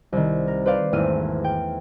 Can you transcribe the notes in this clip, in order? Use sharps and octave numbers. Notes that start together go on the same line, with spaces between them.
C2 D#3
A#4
B4 C5 D5 F5
G#1 E2 A3 F6 D#7
G5